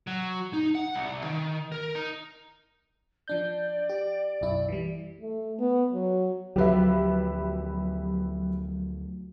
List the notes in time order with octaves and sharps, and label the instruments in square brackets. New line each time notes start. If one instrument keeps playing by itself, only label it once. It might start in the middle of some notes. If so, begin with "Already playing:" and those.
[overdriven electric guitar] F#3
D#4
F#5
C2
D#3
A#4
D#4
[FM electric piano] F3 D4 G6 [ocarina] D5
[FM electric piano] G4
B1 F#2 E4
E3 G3
[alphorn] A3
B3
F#3
[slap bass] D2 F3 [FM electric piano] F#3 [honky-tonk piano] G4 B4 E5